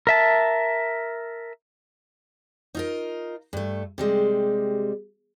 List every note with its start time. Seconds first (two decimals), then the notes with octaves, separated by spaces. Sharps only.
0.07 A#4 E5 A5
2.75 D#4 F4 A#4
3.53 G2 A3
3.98 C3 G3 G#3